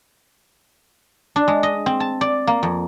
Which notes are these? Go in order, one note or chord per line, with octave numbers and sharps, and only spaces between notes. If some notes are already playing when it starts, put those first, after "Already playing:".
D4
G#3
D#5
C4
A5
D5
A#3
F2